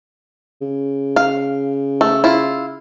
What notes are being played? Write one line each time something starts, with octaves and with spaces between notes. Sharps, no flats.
C#3
F5
A3
E4 F4